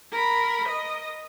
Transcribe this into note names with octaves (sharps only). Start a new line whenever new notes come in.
A#4 B5
D#5